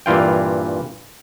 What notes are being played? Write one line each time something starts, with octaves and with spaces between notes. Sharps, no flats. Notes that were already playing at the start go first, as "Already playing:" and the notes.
G2 A#2 E3 F4 G5